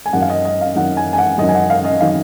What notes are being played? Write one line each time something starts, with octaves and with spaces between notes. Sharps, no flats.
G#5
F#2 D#3 F#3 F#5
F5
D#5
D#5
F5
F#2 D#3 F#3 F#5
G#5
G#5
F#5
F#2 D#3 F#3 D#5
G#5
F#5
F5
D#5
D#3 F#3 F5